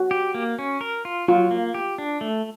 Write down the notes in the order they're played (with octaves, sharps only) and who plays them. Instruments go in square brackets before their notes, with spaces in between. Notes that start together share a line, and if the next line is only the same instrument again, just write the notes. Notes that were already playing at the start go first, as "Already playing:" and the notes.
Already playing: [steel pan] F#4
[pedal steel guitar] G4
A#3
C#4
A#4
F4
[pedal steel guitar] F#3 [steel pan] F4
[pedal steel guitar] A#3
G4
D4
A3